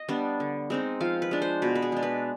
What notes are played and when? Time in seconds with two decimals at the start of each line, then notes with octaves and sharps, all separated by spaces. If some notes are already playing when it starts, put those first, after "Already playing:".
Already playing: D#5
0.08 G3 B3 D4
0.40 D3
0.70 G#3 C4 D#4
1.00 F3 F5
1.22 B4
1.31 G#3 D4
1.42 C5
1.62 B2 B4
1.75 B4
1.82 G#4
1.92 G#3 D4
2.03 B4